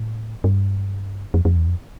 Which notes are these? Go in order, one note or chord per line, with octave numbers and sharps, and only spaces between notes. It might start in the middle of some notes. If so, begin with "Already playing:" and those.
Already playing: A2
G2
F2
F2
E2
F2